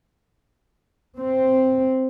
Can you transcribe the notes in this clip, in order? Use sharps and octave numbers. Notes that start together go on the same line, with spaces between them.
C4